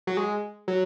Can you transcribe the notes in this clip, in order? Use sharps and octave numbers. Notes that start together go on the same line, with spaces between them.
F#3
G#3
F#3